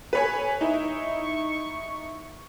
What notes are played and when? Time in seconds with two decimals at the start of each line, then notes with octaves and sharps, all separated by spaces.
0.13 B4 C#5 G#5
0.61 D#4 E4 C#6